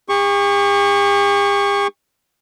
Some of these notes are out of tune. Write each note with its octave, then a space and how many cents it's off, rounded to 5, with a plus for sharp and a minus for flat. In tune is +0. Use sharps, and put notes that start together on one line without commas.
G4 +45 C#6 +0